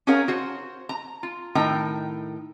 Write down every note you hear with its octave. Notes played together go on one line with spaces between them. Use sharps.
C#4 F#4 G#4 A#4 C#5 F5
F#4 C5
A#5
F4
A2 D#3 G5 A#5